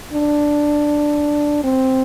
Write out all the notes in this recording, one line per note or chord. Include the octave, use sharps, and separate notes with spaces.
D4
C4